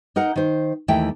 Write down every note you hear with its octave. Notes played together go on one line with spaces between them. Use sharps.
D#4 A#4 F#5
D#3 C5
D#2 E3 A3 G5 A5